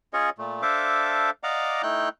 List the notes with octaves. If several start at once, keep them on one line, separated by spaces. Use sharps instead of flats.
C#4 F4 G#4 C#5 D#5
A#2 A3
D4 A4 C5 E5 F5 D6
D5 D#5 F5 F#5 A#5 D6
A3 D#4 E4 G5 F#6 G6